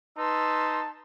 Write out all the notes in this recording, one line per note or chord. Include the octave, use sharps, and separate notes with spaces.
D#4 B4 A5 C6 E6